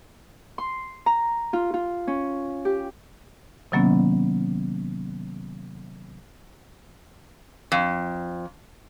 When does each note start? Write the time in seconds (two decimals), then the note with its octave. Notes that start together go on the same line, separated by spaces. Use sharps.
0.58 C6
1.06 A#5
1.53 F4
1.74 F4
2.07 C#4
2.65 G4
3.72 C3 D#3 F#3 A#3 B3 C#4
7.72 F2